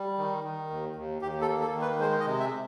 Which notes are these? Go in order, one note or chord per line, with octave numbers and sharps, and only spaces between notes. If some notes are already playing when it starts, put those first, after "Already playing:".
Already playing: G3
D#3
D#3
D#2
D#2
D#2 G4
A4
A#3
A4
D#3
B4
G#3 C5
D#5
C3
E5